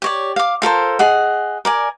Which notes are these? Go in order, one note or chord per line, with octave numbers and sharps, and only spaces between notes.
G4 C#5 D5
F5 D6
F4 A4 A#4 C5
G#4 D#5 F#5
A#4 D5 G#5